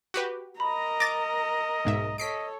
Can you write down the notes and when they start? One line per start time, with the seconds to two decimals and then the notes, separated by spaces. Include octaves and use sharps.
0.14 F#4 G4 B4
0.60 A#4 D#5 A#5 B5
1.00 D6 A6 A#6
1.85 B1 G#2 E5
2.18 A4 C#5 D#5 B6 C7 D7